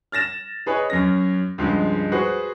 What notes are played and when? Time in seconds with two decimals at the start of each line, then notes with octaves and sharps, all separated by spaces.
0.12 F6 A6 A#6 E7
0.66 G#4 B4 C#5 D#5 G#5
0.90 F#2 C#4 A#6
1.58 C#2 G2 F3 G#3
2.12 F#4 G#4 B4 C5